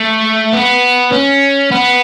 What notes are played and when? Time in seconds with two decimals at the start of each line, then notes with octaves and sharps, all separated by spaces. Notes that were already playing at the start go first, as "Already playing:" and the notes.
Already playing: A3
0.53 B3
1.12 C#4
1.71 B3